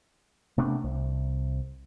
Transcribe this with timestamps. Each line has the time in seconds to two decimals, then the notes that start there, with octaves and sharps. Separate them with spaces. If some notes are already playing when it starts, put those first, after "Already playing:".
0.58 C3 A3 B3 D4
0.84 C2